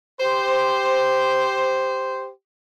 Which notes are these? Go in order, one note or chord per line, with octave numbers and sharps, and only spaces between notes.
G4 C5